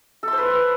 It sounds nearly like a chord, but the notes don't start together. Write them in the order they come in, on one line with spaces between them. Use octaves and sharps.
A4 C6 C5 B4